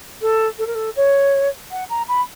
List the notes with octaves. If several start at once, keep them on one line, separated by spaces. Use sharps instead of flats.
A4
A4
A#4
A4
C#5
F#5
A#5
B5